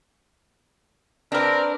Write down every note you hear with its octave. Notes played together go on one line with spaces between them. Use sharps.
C4 D4 A#4 B4